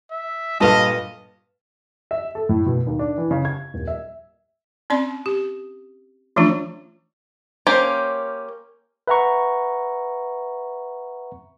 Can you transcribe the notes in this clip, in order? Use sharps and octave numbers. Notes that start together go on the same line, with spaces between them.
E5
G2 A#2 A4 B4 D#5 F5 A5
E5
A4
A2
B2
D#2
D4
E3
C#3
G#6
D#1
E5
C4 C#4 D5 C6
G4
E3 F3 A3 C#4 D4 F4
A#3 C#4 G4 C5
B4 E5 F#5 A#5 C#6